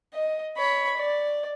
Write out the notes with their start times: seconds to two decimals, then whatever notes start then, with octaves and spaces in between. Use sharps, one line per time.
0.14 D#5
0.57 C#5 B5
0.97 D5